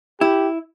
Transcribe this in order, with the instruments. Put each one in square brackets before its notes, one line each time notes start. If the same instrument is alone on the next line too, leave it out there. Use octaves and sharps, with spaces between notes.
[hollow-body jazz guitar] E4 [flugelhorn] G4